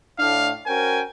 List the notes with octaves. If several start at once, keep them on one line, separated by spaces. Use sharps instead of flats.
A2 D4 F5
C#4 F#4 A#4 C5 G5 G#5